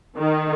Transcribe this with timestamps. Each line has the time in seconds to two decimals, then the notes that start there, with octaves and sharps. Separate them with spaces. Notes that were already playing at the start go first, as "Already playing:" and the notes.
0.18 D#3